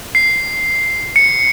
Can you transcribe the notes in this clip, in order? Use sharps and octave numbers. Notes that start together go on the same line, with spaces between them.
C7
C#7